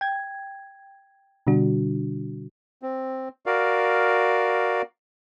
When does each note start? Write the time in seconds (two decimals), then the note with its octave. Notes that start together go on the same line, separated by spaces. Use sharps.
0.01 G5 G#6
1.47 B2 D3 G3 D4 F#4
2.82 C4
3.46 F#4 A#4 D5 F5